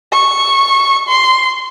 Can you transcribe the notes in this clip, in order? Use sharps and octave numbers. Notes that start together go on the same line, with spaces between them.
C#6
C6